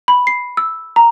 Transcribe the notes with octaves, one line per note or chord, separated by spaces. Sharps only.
B5
C7
E6
A#5